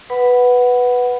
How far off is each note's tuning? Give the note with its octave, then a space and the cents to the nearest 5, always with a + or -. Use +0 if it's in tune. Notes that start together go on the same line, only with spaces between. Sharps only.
B4 +0 F#5 +0 B5 +0